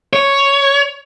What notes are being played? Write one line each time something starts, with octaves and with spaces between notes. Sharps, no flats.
C#5